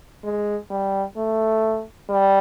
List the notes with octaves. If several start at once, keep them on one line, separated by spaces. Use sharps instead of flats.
G#3
G3
A3
G3